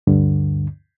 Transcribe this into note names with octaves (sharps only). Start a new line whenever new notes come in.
D2 G2 D3